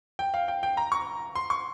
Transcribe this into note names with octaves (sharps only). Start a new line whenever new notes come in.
G5
F5
G5
G5
A#5
C#6
C6
C#6